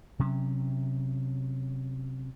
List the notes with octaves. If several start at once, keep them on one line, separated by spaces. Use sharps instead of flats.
C3 F#3 C#4